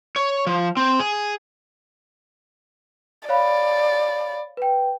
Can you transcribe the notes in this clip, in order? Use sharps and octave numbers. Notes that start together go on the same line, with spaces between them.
C#5
F3
C4
G#4
C#5 D5 F5 B5
B4 G5